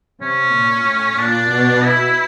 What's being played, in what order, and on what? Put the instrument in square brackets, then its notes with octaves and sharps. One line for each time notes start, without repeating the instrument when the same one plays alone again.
[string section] C3 [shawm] C#4
[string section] A#2
A2
[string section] A#2 [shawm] D4
[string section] B2
[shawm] E4